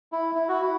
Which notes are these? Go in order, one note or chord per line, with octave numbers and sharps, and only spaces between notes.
E4
E4
F#4
E4